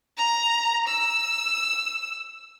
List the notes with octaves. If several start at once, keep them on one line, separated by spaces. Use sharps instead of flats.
A#5
E6